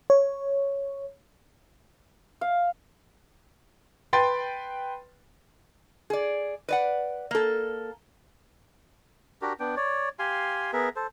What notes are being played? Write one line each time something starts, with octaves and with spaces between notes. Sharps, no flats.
C#5
F5
B4 G5 C6 A6
G#4 D5
B4 D5 F#5
A#3 A4
D4 F#4 G4 A#4
B3 D4 G5
C#5 D5
G4 F5 G#5 C6
B3 G#4 A#4 E5
A4 C5